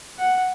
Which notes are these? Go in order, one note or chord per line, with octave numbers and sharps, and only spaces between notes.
F#5